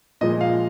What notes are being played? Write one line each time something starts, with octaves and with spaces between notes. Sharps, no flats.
A#2 F3 G#3 D#5
F5